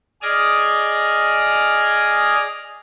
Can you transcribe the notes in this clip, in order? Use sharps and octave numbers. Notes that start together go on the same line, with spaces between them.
G#4 D5 D#5 G#5 D#6 F6